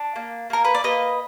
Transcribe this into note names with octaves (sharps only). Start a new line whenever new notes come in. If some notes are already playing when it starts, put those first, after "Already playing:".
Already playing: D4
A#3
A#3 A#4
B4
D5
A#3 B4 D#5